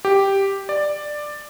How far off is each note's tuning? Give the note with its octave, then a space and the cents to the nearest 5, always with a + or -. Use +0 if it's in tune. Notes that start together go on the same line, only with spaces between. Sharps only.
G4 +0
D5 +10